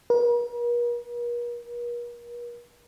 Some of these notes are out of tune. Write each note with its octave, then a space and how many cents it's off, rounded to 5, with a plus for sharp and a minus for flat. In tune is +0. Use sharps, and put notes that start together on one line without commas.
A#4 +45